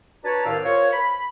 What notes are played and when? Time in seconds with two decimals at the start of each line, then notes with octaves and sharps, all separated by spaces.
0.24 D4 F#4 B4 C#5 A5 A#5
0.45 C2 A2 D#3 D5 F5 E6
0.64 F4 A#4 C5 C#5
0.93 B5